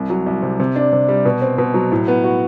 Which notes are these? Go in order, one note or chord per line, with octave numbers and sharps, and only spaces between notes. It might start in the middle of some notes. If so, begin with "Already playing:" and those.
Already playing: C2
F#3
C2
C3
C3
D4
C3
G3
B2
C4
B2
F#3
A2
B3
F#4